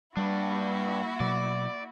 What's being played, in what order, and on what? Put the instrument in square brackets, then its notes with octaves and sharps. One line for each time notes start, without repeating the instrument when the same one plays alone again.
[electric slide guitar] G2 D4 [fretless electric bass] G3 [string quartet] A#3 E4 F#4
[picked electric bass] B2 F#3 [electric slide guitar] D5